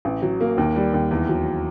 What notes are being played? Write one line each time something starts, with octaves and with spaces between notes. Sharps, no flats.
A1
F#3
A#3
D#2
G3
D#2
E2
F#3